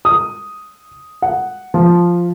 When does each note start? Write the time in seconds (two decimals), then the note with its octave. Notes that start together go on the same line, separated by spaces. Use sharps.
0.05 D#6
1.22 F#5
1.74 F3